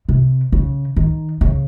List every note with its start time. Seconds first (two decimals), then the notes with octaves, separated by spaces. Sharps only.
0.09 C3
0.52 C#3
0.96 D#3
1.41 C#3